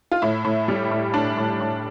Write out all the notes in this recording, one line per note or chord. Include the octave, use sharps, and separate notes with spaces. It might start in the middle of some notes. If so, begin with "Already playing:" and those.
F4
A2 E4
A2
G3
A2
A2 D4
A2
A2